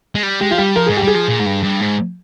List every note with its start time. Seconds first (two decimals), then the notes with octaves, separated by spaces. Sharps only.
0.15 G#3
0.23 G3
0.41 G#3 G4
0.51 F3 F4
0.58 G3 G4
0.76 F3 A#4
0.86 G#2 G#4
0.97 G4
1.03 G3 G#4
1.15 F3
1.29 A#2
1.41 G#2
1.47 G2
1.64 G2
1.81 G#2